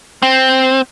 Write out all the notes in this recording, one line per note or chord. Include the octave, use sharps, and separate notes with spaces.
C4